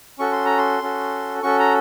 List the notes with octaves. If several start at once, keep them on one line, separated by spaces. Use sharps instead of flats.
C#4 F#4 A4 C#6
C6
A#5
C6
C#4 F#4 A4
C#4 F#4 A4 C#6
A#5